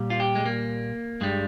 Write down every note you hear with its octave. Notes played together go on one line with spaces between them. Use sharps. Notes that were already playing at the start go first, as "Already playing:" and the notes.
Already playing: A#2 G3
F4
G4
G#3
A#3
G2 G3 G#3